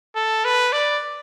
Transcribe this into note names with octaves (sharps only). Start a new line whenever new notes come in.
A4
B4
D5